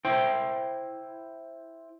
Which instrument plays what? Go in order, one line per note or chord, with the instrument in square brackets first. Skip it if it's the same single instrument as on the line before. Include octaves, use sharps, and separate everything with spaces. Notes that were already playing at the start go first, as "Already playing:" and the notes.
[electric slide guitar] E4 C5 G5